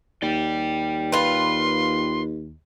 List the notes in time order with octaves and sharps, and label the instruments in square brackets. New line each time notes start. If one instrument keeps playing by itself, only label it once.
[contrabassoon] D#2 [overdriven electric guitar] D5 G5
[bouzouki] F4 B4 [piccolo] C6